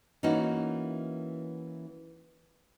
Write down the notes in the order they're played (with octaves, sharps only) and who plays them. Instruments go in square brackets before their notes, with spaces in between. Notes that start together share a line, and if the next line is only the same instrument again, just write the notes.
[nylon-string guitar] E3 A#3 C#4 D#4 F#4